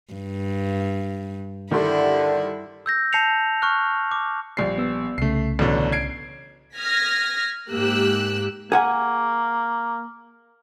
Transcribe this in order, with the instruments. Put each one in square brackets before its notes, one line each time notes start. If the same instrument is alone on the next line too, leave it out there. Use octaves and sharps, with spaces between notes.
[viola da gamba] G2
[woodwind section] D3 [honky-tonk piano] D#3 G3 C6 [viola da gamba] E4
[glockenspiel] E6 G6 A#6
A5 G6 C7 C#7 F7
C#6 F6 F#6
D6
[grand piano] A#1 G3 C7
[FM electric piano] B3 E6
[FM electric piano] C2 C#3 [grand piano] A3 C7
[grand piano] A1 B2 D3
G#6 C7 D7
[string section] D#6 F6 G#6 A#6 B6
G#2 A#3 G4 E6 F#6
[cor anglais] A#3 [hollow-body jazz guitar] G#4 F#5 G#5